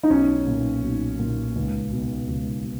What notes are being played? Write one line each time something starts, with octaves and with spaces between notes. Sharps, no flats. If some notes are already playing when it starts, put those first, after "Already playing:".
D#4
B1 C#4
A#2
B1
A#2
C#2
B2
C#2
B2